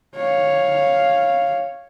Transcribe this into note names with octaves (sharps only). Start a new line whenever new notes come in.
C#5 F5